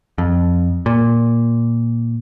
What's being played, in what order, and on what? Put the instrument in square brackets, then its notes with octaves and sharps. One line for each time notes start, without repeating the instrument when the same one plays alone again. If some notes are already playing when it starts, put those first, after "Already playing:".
[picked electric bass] F2
A#2